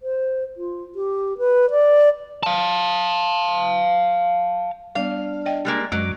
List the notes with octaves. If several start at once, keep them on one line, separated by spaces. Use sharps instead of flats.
C5
F4
G4
B4
D5
F5 A5
G3 B3 D4 F5
D5 D#5 G5
G3 G#3 A#3
F#2 F#3 G#3 D6